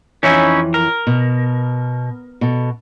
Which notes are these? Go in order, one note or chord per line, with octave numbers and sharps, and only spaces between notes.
F2 E3 C#4 D#4 E4 C#5
A#4
B2
B2 A4